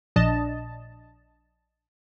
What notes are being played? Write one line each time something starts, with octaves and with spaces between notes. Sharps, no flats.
A#1 D4 D#5 A5